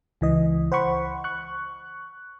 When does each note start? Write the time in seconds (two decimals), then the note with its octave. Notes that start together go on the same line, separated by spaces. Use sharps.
0.21 C#2 E3 D#5
0.72 C5 F#5 B5 C#6
1.24 C#6 F#6